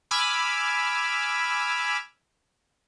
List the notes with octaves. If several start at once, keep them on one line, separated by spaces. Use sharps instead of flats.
G#5 B5 D6 E6 F6